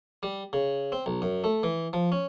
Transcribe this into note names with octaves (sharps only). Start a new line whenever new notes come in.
G3
C#3
C4
B1
F#2
A3
E3
F3
C#4